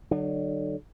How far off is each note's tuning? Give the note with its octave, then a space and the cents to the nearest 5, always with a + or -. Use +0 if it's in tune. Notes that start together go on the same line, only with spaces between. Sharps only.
D3 +0 F#3 +30 D4 +45